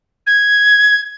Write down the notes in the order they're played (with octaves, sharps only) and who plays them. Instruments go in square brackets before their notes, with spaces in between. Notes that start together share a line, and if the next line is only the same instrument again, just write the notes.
[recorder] G#6